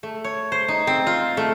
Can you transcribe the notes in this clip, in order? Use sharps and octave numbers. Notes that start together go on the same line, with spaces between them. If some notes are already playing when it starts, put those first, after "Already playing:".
A3
C#5
C5
D#4
C4
F4
A3